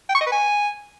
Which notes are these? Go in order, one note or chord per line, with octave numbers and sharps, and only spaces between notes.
G5
C#6
D#5
B4
G#5